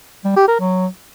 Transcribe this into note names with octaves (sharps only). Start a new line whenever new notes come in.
G3
G4
A#4
F#3